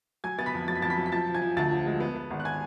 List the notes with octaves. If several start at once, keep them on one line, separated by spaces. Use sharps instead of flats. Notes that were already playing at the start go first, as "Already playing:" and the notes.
F#3 G#5 G#6
B3 A6
B5 B6
F2
F#3 A6
B6
F2 A5 A6
B5 B6
F#3
B6
F3 A5 A6
F3
G#5 G#6
F3
D2 A5 A6
F3
G#3
B3
B3
G#1
F#6
G#5 G#6